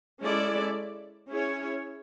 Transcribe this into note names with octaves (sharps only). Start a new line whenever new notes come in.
G#3 C#4 E4 A4 D5
C#4 E4 G#4 C#5